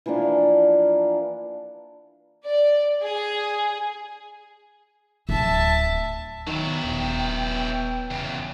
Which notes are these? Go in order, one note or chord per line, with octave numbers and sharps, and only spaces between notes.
E3 F3 A#3 D4
D5
G#4
D1 E5 A5
D#3 F#3 B3 E4 G5
D#1
E2 C#3